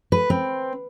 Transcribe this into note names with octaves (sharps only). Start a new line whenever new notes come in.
B4
C4